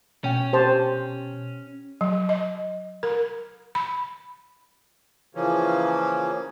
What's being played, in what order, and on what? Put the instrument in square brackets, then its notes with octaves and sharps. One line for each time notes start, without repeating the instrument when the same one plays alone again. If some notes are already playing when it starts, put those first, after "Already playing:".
[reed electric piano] B2 G5 [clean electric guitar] C#4
[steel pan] G4 C5 A5
[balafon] F#3
D#5
A#4
B5
[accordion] C#3 E3 F3 A#3 C#4